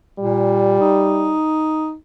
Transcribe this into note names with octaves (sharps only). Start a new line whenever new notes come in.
A#2 G3
D#4